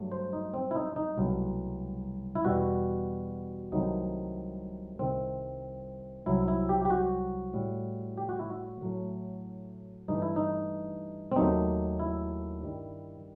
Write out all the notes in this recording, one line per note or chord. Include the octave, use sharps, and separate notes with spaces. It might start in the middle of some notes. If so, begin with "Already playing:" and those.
Already playing: G2 F#3 A3
C5
D#4
C4
E4
D#4
D#4
C2 B2 F#3 A3
E4
E2 B2 G3 F#4
C2 C3 D#3 F#3 A3 D#4
C2 C3 D#3 C4
C2 C3 F#3 E4
E4
G4
G4
F#4
A2 G3
G4
F#4
E4
F#4
A2 F#3 A3
G2 E3 A3 D#4
E4
D#4
C4
D#2 D#3 F#3 A3 D#4
E4
G2 D#3 G3